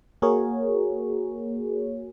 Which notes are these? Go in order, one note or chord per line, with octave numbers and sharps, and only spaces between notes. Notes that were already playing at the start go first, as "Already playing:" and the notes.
A#3 F#4 G#4 A#4 C#5